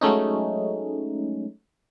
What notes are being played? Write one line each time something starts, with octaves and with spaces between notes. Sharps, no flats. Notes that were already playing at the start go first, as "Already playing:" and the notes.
F#3 G#3 A3 C#4 D#4